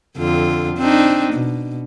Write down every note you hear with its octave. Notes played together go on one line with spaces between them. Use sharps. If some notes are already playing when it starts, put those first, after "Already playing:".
F2 D3 F4
C4 D4 D#4
B2